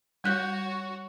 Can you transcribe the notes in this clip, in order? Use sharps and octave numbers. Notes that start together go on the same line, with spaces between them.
G3 F#4 C#5 F#6 G6